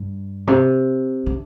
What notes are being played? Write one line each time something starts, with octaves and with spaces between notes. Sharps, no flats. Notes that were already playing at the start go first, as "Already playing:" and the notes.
Already playing: G2
C3
D3